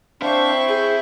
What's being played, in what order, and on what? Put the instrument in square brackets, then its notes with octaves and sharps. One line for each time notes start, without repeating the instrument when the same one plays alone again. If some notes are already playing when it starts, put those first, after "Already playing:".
[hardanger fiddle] C4 C#6 [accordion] D4 C5 F5 [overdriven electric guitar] E4 E5
[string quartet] G#4 [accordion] G6